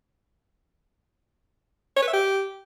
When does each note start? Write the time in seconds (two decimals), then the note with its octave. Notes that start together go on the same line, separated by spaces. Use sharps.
1.97 C#5
2.02 B4
2.08 E5
2.13 G4